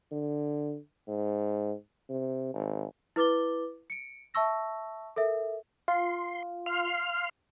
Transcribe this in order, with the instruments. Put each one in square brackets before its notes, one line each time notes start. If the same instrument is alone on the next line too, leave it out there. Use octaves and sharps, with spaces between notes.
[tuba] D3
G#2
C3
G#1
[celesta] E4 B4 D6 A6 G7
C#7 D7
E5 A5 C#6 E6 A#6
A4 A#4 E5
[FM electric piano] F4 [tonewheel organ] C6
[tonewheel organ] F5 C6 F6